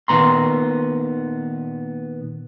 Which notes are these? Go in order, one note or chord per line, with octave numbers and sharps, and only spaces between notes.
A#2 D#3 B3 A#5 C6